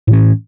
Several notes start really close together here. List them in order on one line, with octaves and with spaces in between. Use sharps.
A2 E3 C#4